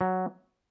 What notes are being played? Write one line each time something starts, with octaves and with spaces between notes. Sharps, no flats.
F#3